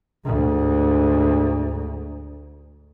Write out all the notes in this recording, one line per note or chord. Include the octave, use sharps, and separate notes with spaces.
D2 G#2